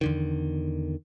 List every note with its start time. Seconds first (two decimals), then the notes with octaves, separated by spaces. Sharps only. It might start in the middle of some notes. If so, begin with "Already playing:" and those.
0.01 E2 D3 D#3